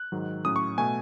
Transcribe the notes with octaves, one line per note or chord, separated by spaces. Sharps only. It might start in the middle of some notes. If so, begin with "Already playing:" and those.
Already playing: F#6
G#2 D#3 F#3
A2 F#3 C#4 D#6
C#6
B2 A3 G#5